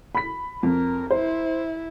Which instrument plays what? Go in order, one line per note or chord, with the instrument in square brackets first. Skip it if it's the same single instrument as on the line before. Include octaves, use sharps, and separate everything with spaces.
[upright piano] B5 B6
[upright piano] F2 [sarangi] A#4
[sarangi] E4 [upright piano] C5